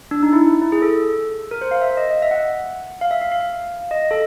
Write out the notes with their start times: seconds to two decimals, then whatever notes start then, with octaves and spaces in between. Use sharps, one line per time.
0.11 D4
0.23 D#4
0.33 E4
0.62 E4
0.72 G#4
0.82 A4
1.51 A#4
1.61 C5
1.71 F5
1.82 E5
1.97 D#5
2.11 D#5
2.22 E5
2.31 F#5
3.01 F5
3.11 E5
3.22 F5
3.32 F5
3.91 D#5
4.11 A4